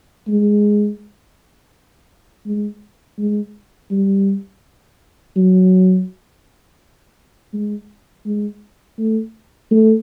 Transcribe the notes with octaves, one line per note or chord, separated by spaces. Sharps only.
G#3
G#3
G#3
G3
F#3
G#3
G#3
A3
A3